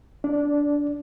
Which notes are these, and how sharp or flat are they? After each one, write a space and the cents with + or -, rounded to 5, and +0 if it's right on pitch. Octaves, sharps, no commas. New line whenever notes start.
D4 -15 D5 +0